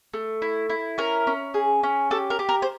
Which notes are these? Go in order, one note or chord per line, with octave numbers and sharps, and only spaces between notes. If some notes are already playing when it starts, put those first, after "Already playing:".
A3
E4
E4
C#4 A#4
C#4
G#4
C#4
G4 A4
A#4
G4
A#4
C5